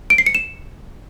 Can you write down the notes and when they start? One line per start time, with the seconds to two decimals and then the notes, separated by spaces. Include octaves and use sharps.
0.10 D7
0.18 C7
0.26 C#7
0.35 E7